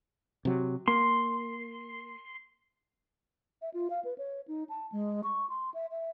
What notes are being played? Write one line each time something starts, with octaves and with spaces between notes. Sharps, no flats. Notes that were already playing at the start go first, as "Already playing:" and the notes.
C3 F#3
A#3 C6
E5
F4
F5
B4
C#5
D#4
A5
G#3
C#6
C6
E5
E5